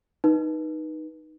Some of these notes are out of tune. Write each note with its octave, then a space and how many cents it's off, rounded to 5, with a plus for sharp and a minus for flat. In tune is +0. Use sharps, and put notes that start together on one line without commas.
D#4 +0 B4 -25